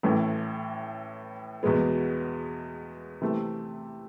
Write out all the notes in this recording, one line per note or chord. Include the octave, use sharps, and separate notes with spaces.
A1 A2 E3 A3
E2 B2 G#3 B3
C3 E3 A3